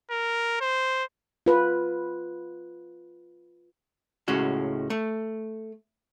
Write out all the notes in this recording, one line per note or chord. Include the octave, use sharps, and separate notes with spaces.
A#4
C5
F4 B4
C#2 A2 G#3 C#4 F#4
A3